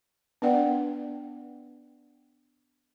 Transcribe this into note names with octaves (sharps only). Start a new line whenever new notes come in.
B3 D4 B4 D5 F#5 G5